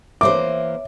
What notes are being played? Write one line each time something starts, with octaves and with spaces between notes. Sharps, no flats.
E3 A#3 C5 C#5 E5 D6